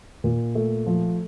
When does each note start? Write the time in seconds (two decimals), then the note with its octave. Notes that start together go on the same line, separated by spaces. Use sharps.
0.24 A#2
0.55 A3
0.86 F3